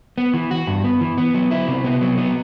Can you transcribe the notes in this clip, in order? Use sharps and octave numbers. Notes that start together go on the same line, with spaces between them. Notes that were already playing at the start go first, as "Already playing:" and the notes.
B3
E3
F#4
G2
B3
E3
B3
F#3
E4
C3
B3
F#3
B3